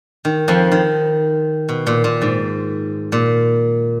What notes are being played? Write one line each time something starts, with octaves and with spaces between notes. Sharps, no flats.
D#3
F2 F3
D#3
B2
A#2
A#2
G#2
A#2